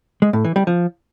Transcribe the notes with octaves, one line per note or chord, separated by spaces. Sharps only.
G#3
A2
E3
G3
F3